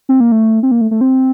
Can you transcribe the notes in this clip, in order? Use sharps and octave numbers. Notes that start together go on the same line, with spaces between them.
C4
A#3
A3
C4
A#3
A3
A3
C4